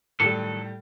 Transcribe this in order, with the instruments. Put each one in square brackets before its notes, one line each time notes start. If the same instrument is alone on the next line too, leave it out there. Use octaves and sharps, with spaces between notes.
[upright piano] A2 G3 [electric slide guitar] D#3 F#3 A4